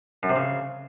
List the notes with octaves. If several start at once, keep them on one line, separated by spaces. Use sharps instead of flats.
F#2
C3
C#3